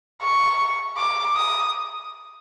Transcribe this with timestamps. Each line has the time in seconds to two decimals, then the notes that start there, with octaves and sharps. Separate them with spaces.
0.21 C#6
0.97 D6
1.36 D#6